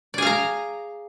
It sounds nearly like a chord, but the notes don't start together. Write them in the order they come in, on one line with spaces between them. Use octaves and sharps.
D5 G#4 F5 A#5